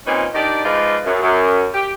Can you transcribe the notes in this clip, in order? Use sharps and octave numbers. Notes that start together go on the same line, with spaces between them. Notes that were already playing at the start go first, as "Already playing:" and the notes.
A#2 C4 C#4 D#4 B4 C#5
D#3 D4 D#4 G4 D5
F3 G#3 D#4 F4 B4 D5
F#2
F#2
G4